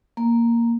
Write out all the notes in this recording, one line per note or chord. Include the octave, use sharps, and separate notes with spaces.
A#3